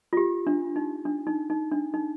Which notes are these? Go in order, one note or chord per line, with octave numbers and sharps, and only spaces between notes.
F4
G4
D4
D#4
D4
D#4
D#4
D4
D#4